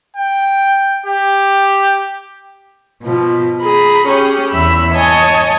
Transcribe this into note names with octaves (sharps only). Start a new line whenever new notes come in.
G5
G4
B2 F3
G#4 A#5 B5
C#4 G4 G#4
E2 E5 B5 E6
C#5 D#5 G#5 A5